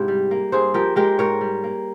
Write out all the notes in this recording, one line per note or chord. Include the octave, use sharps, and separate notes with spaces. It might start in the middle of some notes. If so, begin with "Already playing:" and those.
Already playing: G#2 C3 E4 G4
G3
A#3
G2 G#4 C5
F3 G4 A#4
G#3 G4 A#4
G#2 A#4 C#5
G3
A#3